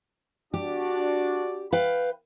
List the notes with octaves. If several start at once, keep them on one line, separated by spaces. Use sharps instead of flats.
D4 F#4 G4 D5
B4 F5 G5